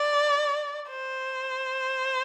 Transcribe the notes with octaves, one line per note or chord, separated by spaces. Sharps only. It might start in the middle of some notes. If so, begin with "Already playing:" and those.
Already playing: D5
C5